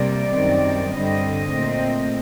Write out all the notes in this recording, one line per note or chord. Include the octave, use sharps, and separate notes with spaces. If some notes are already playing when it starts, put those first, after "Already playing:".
Already playing: C3 G3 A#3 D5
F#2 D#3 G3 C4
G2 D3 G3 C4 D#5
A#2 A3 C4